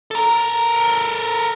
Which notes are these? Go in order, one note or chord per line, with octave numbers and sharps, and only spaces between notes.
A4 A#4